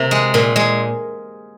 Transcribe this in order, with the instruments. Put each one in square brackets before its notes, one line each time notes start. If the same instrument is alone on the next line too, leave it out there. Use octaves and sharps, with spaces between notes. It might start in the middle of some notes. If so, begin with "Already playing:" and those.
Already playing: [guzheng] C3 A#3
G#3
A#2
G#3